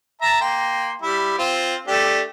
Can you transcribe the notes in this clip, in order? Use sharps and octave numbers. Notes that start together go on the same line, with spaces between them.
E5 A5 A#5
A#3 G5 C6
G3 E4
C4 F4
A3 D4 G4